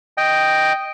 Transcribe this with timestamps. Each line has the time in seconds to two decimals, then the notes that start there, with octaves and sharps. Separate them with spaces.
0.18 D#5 G5